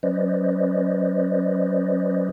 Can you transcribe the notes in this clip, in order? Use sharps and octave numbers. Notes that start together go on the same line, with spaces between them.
F#3 C#4 B4 C5 D5 D#5